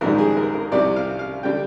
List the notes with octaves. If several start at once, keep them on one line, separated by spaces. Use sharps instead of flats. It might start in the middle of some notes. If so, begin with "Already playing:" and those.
A#1 G#2 D#3 G3 A#4
G#4
A#4
A#4
C2 C3 G3 D5
F5
F5
D3 G3 G5